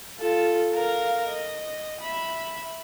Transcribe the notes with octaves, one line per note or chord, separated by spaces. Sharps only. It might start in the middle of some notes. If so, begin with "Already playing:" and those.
F4 A4
A#4 F5
D#5
E5 B5